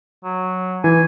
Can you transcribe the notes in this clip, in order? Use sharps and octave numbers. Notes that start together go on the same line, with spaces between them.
F#3
E3 G#5